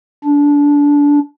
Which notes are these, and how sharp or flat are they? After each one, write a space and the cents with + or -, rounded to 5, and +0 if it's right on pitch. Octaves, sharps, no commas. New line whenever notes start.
D4 -20